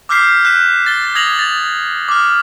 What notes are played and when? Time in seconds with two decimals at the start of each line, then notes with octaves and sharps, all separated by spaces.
0.09 D6 E6 F6 G6 B6 C7
0.45 F#6 B6 E7
0.86 A6 G7
1.15 D#6 G#6 A#6 F7 F#7
1.39 A6
2.08 D6 F6